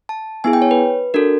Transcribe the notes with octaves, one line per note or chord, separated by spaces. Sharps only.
A5
B3 E4 G#4 G#5
G5
C#5
B4
D4 F#4 A4 A#4